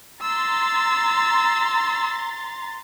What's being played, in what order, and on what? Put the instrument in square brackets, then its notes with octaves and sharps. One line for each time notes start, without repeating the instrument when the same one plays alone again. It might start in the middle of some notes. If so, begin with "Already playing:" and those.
[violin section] A#5 C6 A6 [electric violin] E6